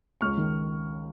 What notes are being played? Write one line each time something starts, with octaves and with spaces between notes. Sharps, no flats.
C#2 C#6 F6
D#3